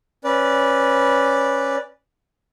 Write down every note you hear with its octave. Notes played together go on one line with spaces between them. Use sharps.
C#4 B4 D5